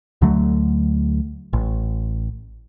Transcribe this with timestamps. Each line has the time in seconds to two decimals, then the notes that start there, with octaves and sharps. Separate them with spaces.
0.21 D2 D3 F#3 A3
1.53 A1